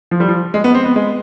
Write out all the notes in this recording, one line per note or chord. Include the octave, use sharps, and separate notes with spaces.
F3
G3
F3
G#3
B3
C4
B3
G#3